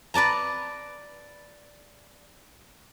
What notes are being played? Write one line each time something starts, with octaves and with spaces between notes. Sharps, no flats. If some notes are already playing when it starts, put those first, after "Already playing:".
B4 D5 A5 A#5